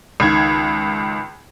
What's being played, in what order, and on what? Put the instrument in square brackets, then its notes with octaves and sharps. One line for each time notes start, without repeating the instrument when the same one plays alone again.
[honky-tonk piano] C#2 D#3 G#6